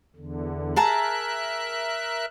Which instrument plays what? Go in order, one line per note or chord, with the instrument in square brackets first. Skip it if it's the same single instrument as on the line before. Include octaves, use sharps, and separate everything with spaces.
[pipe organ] E2 D3
[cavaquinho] G#4 A5 A#5 [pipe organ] A#4 E5 F#6